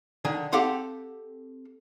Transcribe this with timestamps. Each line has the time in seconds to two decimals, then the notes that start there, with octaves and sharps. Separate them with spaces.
0.25 D3 D#3 G#5
0.52 C4 G4 A4 F5 F#5 C6